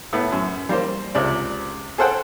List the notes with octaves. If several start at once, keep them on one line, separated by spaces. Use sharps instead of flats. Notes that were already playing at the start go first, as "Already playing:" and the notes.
A2 B3
F#2
G3 A#3 C5
C#2 C3 D5
G#4 A4 C5 F#5 G5